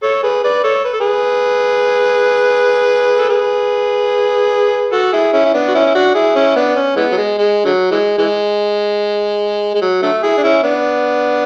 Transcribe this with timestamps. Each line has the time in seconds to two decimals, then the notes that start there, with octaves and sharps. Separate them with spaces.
0.03 A4 C#5
0.23 G#4 B4
0.44 B4 D5
0.64 A4 C#5
0.85 B4
0.93 A4
1.00 G#4 B4
3.18 A4
3.29 G#4 B4
4.92 F#4 A4
5.12 E4 G#4
5.33 C#4 E4
5.45 E4
5.54 B3 D4
5.68 F#4
5.74 C#4 E4
5.86 E4
5.95 D4 F#4
6.15 E4 G#4
6.35 C#4 E4
6.55 B3 D4
6.76 C#4
6.96 E3 G#3 B3
7.12 F#3
7.17 G#3
7.38 G#3
7.65 D3 F#3
7.91 E3 G#3
8.18 E3 G#3
9.74 G#3
9.82 F#3
10.02 D3 F#3 A3
10.23 E4 G#4
10.37 D4
10.44 C#4 E4
10.63 B3 D4